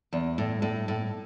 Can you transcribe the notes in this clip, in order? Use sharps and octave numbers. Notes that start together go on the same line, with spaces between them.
E2
A2
A2
A2